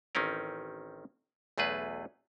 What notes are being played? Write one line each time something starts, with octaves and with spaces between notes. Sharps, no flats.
A1 D#3 C4 C#4 A#4
B1 E2 A3 G#4 B4